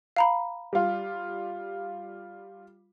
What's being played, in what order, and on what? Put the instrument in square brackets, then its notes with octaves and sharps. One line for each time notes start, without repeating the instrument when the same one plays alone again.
[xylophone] F5 A#5 B5
[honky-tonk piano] G3 F4